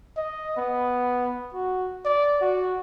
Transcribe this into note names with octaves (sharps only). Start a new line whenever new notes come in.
D#5
B3
F#4
D5
F#4